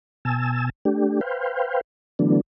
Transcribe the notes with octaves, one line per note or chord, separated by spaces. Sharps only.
B2 G#5 A5 E6
A3 D4 G4
B4 C5 F5 G5
D3 E3 F#3 A3 B3 D4